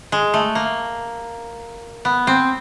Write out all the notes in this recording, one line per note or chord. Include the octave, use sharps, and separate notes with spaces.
G#3
A3
A#3
B3
C4